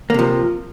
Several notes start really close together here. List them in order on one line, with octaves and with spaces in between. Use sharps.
A#3 C3 F3